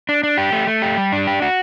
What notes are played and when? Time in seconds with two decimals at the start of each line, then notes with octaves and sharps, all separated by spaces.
0.09 D4
0.23 D4
0.37 G4
0.52 A3
0.67 A3
0.82 G4
0.97 G3
1.13 D4
1.27 G4
1.42 F#4